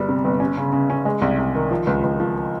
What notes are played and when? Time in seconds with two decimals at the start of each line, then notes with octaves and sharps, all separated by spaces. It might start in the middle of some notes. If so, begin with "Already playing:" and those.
Already playing: G1 G3
0.09 C3
0.25 G1
0.40 C#4
0.57 C#3
0.73 C#3
0.90 C#4
1.05 G#3
1.22 C2
1.38 C2
1.55 D#3
1.71 F3
1.87 C#2
2.04 C#2
2.20 F3